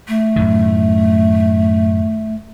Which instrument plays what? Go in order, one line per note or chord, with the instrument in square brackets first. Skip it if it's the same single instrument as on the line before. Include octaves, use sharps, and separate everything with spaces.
[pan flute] A3
[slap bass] F#2 A2 D#3